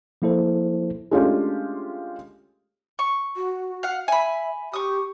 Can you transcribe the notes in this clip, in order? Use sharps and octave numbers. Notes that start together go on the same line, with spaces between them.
F3 A#3 E4 A4 C5
G#3 A3 C#4 D4 F4 G4
C#6
F#4
F5 F#5
E5 G#5 B5
G4 C#6 D#6